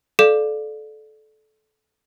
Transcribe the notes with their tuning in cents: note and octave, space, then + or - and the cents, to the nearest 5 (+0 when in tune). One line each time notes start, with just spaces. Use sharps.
A4 -20 D5 +15 F5 +0